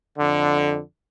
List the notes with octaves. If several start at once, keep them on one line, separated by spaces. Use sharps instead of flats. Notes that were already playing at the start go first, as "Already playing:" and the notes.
F2 D3